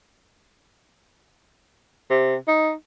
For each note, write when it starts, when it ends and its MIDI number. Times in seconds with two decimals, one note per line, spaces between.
2.10 2.35 48
2.48 2.72 63